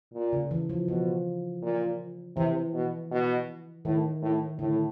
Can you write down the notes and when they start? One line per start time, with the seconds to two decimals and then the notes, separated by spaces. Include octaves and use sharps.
0.14 A#2
0.33 C#3
0.51 E3
0.69 F3
0.88 B2 F3
1.62 A#2
2.36 C3 E3
2.74 B2
3.11 B2
3.85 A2 D#3
4.22 A2
4.59 A2 D3